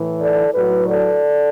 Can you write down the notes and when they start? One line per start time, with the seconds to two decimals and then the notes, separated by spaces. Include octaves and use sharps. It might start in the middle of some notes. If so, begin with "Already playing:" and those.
Already playing: A2 E3
0.22 A4 D5
0.55 A2 F#3 F#4 B4
0.88 A4 D5